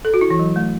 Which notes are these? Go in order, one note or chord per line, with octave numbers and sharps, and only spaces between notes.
A4
F#4
E4
E3
F#3
A3